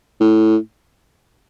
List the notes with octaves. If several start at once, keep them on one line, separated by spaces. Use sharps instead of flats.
A2